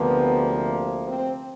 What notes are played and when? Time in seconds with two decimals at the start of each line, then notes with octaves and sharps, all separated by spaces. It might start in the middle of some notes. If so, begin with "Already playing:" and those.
Already playing: D2 C3 F3 A#3 B3
1.08 C4